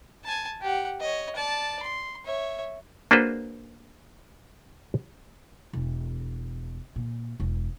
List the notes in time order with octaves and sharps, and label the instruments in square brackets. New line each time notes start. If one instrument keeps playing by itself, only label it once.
[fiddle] G#5 A5
G4 F#5
C#5 D#5
D5 A5
C6
C#5 E5
[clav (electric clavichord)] A#3 D4 F#4 G#4 B4 C5
[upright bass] E1
A#2
E1